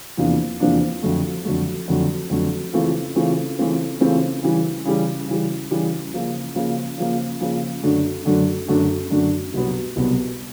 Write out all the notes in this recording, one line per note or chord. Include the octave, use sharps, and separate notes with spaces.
E2 C3 F3 A#3 D4
E2 C3 F3 A#3 D4
F2 D3 F#3 A3
F2 D3 F#3 A3
F2 D3 F#3 A3
F2 D3 F#3 A3
C#3 E3 A3 C4 F4
C#3 E3 A3 C4 F4
C#3 E3 A3 C4 F4
C#3 E3 A3 C4 F4
C#3 E3 G3
C#3 E3 G3
C#3 E3 G3
C#3 E3 G3
C#3 F3 A#3
C#3 F3 A#3
C#3 F3 A#3
C#3 F3 A#3
F#2 D3 F#3 A3 D4
F#2 D3 F#3 A3 D4
F#2 D3 F#3 A3 D4
F#2 D3 F#3 A3 D4
C2 B2 F#3 B3
C2 B2 F#3 B3